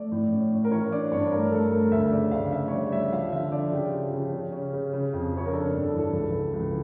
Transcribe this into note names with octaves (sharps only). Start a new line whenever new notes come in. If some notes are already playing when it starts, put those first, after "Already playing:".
Already playing: A3 D5
A2
C#4
C#4
A#4
E3 C#5
D4 D5
G2 C#5
A3 A#4
A3 A4
A3 A#4
D2 E5
C#3 D5
D2 F5
C#3 E5
C#5
G3 D5
G3 E5
F3 F5
D3 E5
D3 D5
C#3 G4
F3
C#3
C#3
C#4
C#3
C#3
F2
C#3 C#5
A#4
D4 A4
G2
A4
E3
A4
C#2
E3
C#2